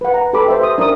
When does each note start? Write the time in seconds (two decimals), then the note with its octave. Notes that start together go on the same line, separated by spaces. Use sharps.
0.01 B4 F#5
0.14 A#5
0.33 G4 A4 B4 B5 D6
0.48 C5 E5
0.62 C5 D#6
0.78 D4 A#4 E5 D#6